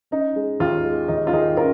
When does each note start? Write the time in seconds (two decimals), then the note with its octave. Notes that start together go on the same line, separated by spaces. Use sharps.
0.11 C#4 D#4
0.36 G#3
0.60 D#2 F4
0.85 G#3
1.08 D#2 D#4
1.27 F4
1.33 D#3 D#4 G#4
1.57 C#4 F4 A#4